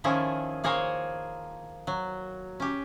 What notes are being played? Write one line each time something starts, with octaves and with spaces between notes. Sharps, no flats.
D#3 F3 C#4 E4 G#4 A4
A#3 G#4 A#4 C5 C#5
F#3
C#4 G4